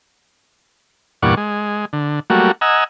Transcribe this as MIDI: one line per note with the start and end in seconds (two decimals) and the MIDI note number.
1.23 1.35 40
1.23 1.35 43
1.23 1.35 46
1.23 1.35 74
1.23 1.35 78
1.23 1.35 85
1.37 1.85 56
1.93 2.20 50
2.30 2.51 54
2.30 2.51 55
2.30 2.51 57
2.30 2.51 58
2.30 2.51 66
2.61 2.84 75
2.61 2.84 78
2.61 2.84 80
2.61 2.84 82
2.61 2.84 88